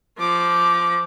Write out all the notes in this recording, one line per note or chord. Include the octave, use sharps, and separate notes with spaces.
F3 D6